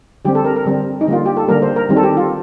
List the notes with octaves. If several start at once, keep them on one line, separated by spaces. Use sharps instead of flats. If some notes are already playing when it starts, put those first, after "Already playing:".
D3 G3 C4 G4
A4
A#4
A#4
D3 G3 C4
D#4
D3 G3 A#3 F4
G4
A4
D3 G3 A#3 A#4
C5
A#4
D#3 G3 C4
A4
G4
F4